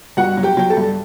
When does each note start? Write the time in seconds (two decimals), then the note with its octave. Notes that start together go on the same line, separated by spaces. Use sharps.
0.17 G2 F#4 F#5
0.37 F#3
0.43 G4 G5
0.57 F#3 G5
0.70 A4 A5
0.77 G2